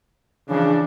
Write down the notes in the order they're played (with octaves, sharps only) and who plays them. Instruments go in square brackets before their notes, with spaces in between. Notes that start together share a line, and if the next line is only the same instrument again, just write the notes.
[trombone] C#3 [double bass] E3 F3 [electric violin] D4